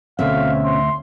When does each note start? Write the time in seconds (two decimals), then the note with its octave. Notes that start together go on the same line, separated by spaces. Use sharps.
0.19 D2 B2 C4 C#4 E5 F5
0.64 C6